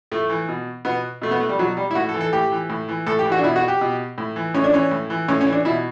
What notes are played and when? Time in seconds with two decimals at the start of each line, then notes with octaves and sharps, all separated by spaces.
0.12 A2 A3
0.29 E3
0.49 B2
0.85 B2 B3
1.22 B2 A3
1.31 B3
1.40 A3
1.49 G3
1.59 B2 F#3
1.77 G3
1.91 E4
1.95 A2 F#4
2.09 A4
2.14 E3
2.21 A4
2.33 A2 G4
2.52 E3
2.69 A2
2.88 E3
3.06 A2 A4
3.19 G4
3.25 E3
3.32 F#4
3.38 D4
3.43 B2 E4
3.56 F#4
3.68 G4
3.81 B2
4.18 A2
4.36 E3
4.54 A2 C#4
4.64 D4
4.73 E3 C#4
4.91 A2
5.10 E3
5.28 A2 C#4
5.41 C#4
5.46 E3
5.53 D4
5.65 B2 E4